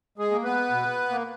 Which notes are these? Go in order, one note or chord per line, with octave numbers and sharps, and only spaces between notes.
G#3 G#4
A#3
B3 B4
B2
A#3